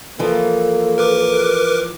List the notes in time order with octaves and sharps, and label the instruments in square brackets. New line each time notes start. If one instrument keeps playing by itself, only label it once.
[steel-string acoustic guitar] E3 F3 [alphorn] A#3 [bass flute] A4
[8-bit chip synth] A#4 B4 D6